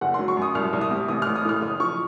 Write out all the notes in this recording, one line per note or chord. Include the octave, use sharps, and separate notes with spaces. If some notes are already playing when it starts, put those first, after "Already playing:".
F#1 F#5
F#3 C6
C#6
F#2 D#6
C2 F6
C2
D#6
C3
A1 D#6
A1 F6
D#6
A2 F6
F#1 D#6
F3 C#6